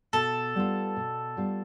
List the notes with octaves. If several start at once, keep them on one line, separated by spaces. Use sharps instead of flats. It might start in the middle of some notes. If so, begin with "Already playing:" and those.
B2 A4
G3 B3 F4
B2
G3 B3 F4